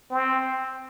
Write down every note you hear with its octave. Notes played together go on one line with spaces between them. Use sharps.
C4